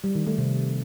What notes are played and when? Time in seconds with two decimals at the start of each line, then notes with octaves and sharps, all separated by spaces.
0.04 G3
0.15 D#3
0.27 A3
0.38 C3